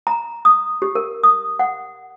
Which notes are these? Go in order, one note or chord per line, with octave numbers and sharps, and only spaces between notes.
A#5
D#6
G4
A#4
D#6
F#5